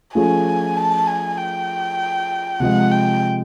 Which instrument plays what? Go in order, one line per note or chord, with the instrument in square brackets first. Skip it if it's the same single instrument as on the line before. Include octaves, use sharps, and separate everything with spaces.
[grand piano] F3 A3 C#4 F4 G#4 [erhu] G#5
[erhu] A5
G#5
G5
[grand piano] C3 F3 G#3 [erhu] F#5
[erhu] G5